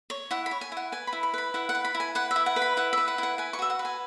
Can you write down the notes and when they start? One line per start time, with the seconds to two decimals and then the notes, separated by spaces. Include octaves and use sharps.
0.10 C#5
0.31 E4 F#5
0.46 B5
0.51 C#5
0.61 G#5
0.72 E4 F#5
0.92 B4 G#5
1.07 B5
1.13 E4
1.23 B5
1.34 B4 B5
1.54 E4 F#5
1.69 F#5
1.75 B4
1.85 B5
1.95 E4
2.00 G#5
2.15 B4 F#5
2.31 E5
2.36 E4
2.46 F#5
2.56 B4
2.62 B5
2.77 E4 F#5
2.93 B4 E5
3.08 F#5
3.18 E4 F#5
3.38 B4 G#5
3.53 C#6
3.59 F#4 E5
3.70 F#5
3.79 B4
3.85 G#5